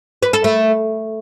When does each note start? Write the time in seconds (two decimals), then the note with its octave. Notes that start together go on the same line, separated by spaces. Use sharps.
0.23 B4
0.33 A4
0.44 A3